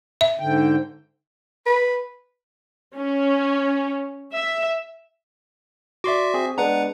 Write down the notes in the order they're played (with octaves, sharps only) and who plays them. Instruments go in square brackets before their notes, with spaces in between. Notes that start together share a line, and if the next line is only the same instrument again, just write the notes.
[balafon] E5
[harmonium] G#2 D3 G5
[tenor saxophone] B4
[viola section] C#4
E5
[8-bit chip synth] F#4 E5 [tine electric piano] D5 C6 D6
[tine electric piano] C4 G#4
[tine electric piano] G#3 B3 D4 [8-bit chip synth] B4 F#5 A#5